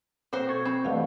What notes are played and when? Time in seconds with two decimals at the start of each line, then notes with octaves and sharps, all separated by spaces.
0.33 B2 A#3 C4 F#4 C5
0.49 A4 C#6 G#6
0.65 C4 B5
0.85 D2 G2 B2 E3 G3 A3 F5 F#5